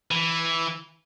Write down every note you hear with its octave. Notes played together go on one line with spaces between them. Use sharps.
E3